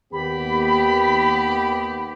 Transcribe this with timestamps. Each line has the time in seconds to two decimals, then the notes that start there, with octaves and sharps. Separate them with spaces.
0.13 D#2 B3 G4 B5